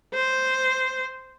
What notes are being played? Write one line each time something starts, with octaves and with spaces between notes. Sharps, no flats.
C5